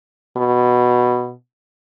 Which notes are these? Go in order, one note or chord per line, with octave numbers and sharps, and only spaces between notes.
B2